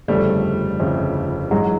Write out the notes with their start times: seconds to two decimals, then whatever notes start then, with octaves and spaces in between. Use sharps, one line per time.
0.08 G1 F2 C#3 G3 A3
0.80 G1 F2 C#3
1.51 A1 G2 E3 F#3 G#3